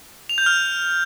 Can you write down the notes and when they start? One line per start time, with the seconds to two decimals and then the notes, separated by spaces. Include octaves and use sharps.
0.29 F7
0.38 G6
0.46 F6